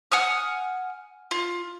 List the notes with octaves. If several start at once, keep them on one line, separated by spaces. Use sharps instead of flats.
F#5 G#5 D#6 F6
F4